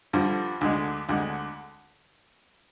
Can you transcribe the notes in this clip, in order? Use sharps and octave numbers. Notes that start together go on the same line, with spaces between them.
G2 D3 F3
D2 D3 G#3
D2 D3 G#3